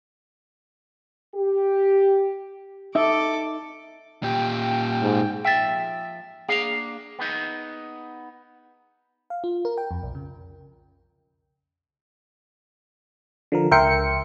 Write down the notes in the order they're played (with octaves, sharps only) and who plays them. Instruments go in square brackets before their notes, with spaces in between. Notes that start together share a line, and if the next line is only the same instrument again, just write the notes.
[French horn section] G4
[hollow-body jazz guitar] D#4 E5 [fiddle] A4 D6
[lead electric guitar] A#2 G4 [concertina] G5
[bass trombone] G#2
[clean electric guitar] F3 E5 [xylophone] G5 A6
[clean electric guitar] A#3 D4 F5 [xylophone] G#4 F7
[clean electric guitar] B3 D#4
[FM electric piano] F5
F4
A#4
G5
F2
B1
C#3
D3 F3 A#4
C#2 A#4 E5 G5 C6 C#7